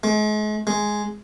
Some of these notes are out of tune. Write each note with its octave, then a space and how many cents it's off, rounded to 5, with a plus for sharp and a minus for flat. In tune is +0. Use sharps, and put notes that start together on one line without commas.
G#3 +40
G#3 +5